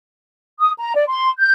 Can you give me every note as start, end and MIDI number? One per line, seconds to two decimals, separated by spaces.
0.59 0.72 87
0.78 0.94 82
0.95 1.03 74
1.08 1.28 84
1.38 1.52 91